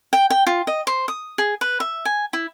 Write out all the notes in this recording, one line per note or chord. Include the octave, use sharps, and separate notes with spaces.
G5
G5
F4
D#5
C5
D#6
G#4
B4
E5
G#5
E4